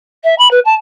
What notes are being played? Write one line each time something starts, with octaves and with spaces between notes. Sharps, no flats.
E5
B5
B4
A5